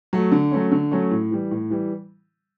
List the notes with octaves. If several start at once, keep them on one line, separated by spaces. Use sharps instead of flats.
F#3 A3
D3
F#3 A3 C#4
D3
F#3 A3 C#4
A2
E3 G3
A2
E3 G3